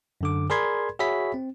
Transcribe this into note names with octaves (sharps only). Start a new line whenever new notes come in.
F#2 D3 D6
G#4 A#4 D5 B5 C6 G#6
F#4 G#4 C#5 E5 B5 B6
C4